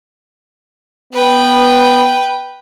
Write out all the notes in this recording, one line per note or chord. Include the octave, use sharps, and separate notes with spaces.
B3 B4 G5